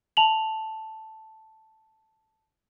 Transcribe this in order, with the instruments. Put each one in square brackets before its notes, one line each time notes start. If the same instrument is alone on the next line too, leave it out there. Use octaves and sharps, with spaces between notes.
[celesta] A5 F7 F#7